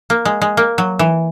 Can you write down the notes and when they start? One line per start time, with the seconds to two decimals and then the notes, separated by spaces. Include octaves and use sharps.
0.10 A#3
0.25 G#3
0.42 G#3
0.57 A#3
0.78 F#3
0.99 E3